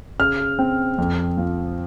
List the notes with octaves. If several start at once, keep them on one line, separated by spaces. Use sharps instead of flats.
C#3 F6
C4
F2
F3